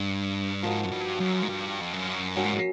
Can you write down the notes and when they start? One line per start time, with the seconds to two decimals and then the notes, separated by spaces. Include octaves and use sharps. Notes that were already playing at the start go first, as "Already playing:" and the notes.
Already playing: G2
0.63 G#2 F3 A#3 D#4 F#4
0.85 F#2
0.92 G2
1.20 F#2
1.43 G#2
1.49 G2
1.81 F2
1.93 F#2
2.36 G2 F#3 A#3 C#4
2.44 G#2